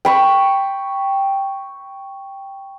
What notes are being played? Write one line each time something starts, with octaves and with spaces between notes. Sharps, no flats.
G5 B5 C#6